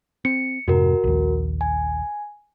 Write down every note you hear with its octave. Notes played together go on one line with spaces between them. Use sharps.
C4 C#7
F2 G#2 C3 F#4 A#4
A#1 D#2
G#5